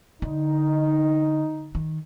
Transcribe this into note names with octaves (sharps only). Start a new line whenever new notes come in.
D3 D#4
D#3